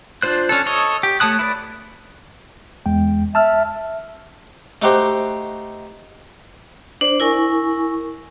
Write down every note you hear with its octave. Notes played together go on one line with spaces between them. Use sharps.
D4 F4 C5 F#6
C#4 D4 A4
A4 C#5 D#5
G4
A3 C#5 A5 D#6 F#6
E4 B4 D5
E2 G#3 G5
E5 A5 E6 F6
A3 D#4 F#4 G4 C5
D4 C5 D5
E4 A#4 G#5 C#6